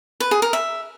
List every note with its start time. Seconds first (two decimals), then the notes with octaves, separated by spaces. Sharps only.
0.20 B4
0.31 G#4
0.42 A#4
0.53 E5